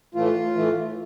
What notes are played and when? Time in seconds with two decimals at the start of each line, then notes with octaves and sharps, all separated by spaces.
0.15 A2 E3 A3 F4
0.55 A2 E3 A3